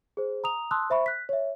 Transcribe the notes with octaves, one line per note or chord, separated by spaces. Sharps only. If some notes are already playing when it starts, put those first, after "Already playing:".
G#4 C5
A#5 D#6 F7
A5 C6 D#6 E6 F#6
C5 E5 B5 C#6
F#6 B6
C#5 E5